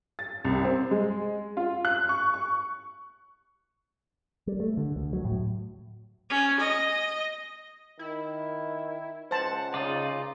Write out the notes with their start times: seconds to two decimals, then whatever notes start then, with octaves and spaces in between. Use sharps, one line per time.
0.19 A6
0.45 C2
0.65 C4
0.91 G#3
1.57 F4
1.85 F#6
2.09 C#6
2.34 C#6
4.47 G3
4.60 A3
4.77 D3
4.96 D2
5.13 F#3
5.25 A2
6.30 C#4
6.60 D#5
7.99 D#3 E4
9.31 C#2 C5 F#5 A5
9.74 C#3 D#4 F4 D5